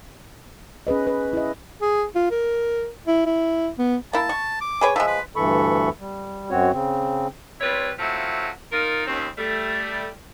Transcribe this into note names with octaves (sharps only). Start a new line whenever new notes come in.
C#4 G#4 B4 D#5
B4
E4 D#5
G#4
F4
A#4
E4
E4
B3
A#3 E4 A5
C#6
D6
G#4 B4 C#5
F3 G#3 E5
B4
D2 G2 E3 A4 B5 C#6
G3
F#2 C4 F#4 C#5
C#3 C4
G3 C4 E4 F4 B4 C#5
F#3 A3 C4 C#4 E4 F4
D#4 F4 A#4
D#2 C4 C#4
G3 A3